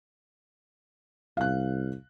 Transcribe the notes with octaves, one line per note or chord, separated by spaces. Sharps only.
C2 F5 F#6